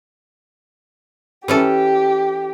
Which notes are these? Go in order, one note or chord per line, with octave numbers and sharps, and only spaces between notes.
E3 C#4 G4 A4